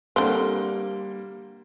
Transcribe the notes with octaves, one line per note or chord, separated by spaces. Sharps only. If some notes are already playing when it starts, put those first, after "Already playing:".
D3 G3 A#3 C4